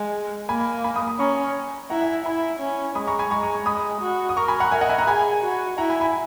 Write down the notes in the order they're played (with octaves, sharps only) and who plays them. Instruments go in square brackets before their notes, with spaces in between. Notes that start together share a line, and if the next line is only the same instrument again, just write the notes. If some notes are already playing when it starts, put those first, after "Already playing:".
Already playing: [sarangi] G#3
[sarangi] A#3 [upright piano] G#5 B5
[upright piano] G#5 B5
B5 D#6
B5 D#6
[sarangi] C#4 [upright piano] A#5 C#6
[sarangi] E4 [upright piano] F#5 A#5
[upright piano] E5 G#5
[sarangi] E4 [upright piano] G#5 B5
[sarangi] C#4
[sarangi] G#3 [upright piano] B5 D#6
[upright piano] A#5 C#6
G#5 B5
[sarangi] G#3 [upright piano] A#5 C#6
[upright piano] A#5 C#6
[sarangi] G#3 [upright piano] B5 D#6
[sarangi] F#4
[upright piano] D#6
[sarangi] A#4 [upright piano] A#5 C#6
[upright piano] G#5 B5
F#5 A#5
[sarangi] A#4 [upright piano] E5 G#5
[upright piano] D#5 F#5
E5 G#5
F#5 A#5
[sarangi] G#4 [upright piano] G#5 B5
[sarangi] F#4
[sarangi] E4 [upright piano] F#5 A#5
[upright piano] G#5 B5
G#5 B5